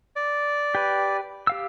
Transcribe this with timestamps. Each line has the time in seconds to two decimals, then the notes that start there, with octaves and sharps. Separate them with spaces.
0.16 D5
0.75 G4 B4
1.47 G4 F5 E6